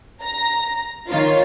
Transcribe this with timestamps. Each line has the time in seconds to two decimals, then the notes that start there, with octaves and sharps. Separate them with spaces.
0.21 A#5 A#6
1.09 D#3 F4 C#5